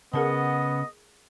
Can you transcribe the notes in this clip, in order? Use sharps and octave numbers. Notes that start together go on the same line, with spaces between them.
C#3 B3 C#4 G#4 A#4 D#5 F#5 A5